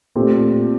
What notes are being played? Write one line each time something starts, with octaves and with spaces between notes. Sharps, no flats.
A#2 A3 C4 G4